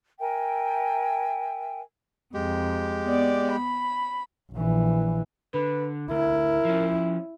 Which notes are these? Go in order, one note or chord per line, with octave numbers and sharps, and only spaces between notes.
A#4 E5 G5 G#5
F2 G#3 G4
B3 D5
B5
A#1 E3
D3 B4
D2 E4 A#4
F3 C#4